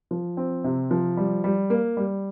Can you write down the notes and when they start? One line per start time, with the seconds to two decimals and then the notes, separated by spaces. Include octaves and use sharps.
0.11 F3
0.37 C4
0.64 C3
0.91 F3
1.17 G3
1.44 G3
1.70 A#3
1.97 G3